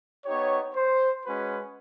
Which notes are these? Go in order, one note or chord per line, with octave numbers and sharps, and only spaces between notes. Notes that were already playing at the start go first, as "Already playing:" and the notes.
B3 D#4 G4 C#5
C5
G#3 C#4 F#4 B4